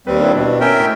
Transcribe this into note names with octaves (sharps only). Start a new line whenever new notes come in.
D#2 G3 C4 B4
D4 E4
B2
C#4 A#4 E5 G5 G#5 D7
A2 B6